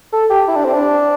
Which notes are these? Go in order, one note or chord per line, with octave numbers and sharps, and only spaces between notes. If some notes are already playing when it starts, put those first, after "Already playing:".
A4
G4
E4
D4
C4
D4